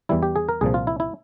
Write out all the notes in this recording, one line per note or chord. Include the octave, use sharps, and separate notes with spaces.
E2 E3 G3 E4
G4
G#4
A#4
C2 A#2 F3 G#4
F4
E4
E4